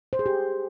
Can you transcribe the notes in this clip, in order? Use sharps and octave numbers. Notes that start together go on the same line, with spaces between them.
C5
G#4
G4